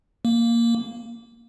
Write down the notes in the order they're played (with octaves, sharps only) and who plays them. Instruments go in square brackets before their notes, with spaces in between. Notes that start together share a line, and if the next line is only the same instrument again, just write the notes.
[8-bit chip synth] A#3